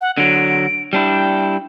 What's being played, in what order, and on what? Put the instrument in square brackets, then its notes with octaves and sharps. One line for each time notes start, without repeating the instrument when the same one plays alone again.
[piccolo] F#5
[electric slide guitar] D3 F#3 [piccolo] D7
[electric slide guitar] G3 D4 E4 [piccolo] G5